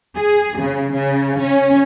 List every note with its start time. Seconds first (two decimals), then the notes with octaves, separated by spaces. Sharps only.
0.18 G#4
0.60 C#3
0.94 C#3
1.41 C#4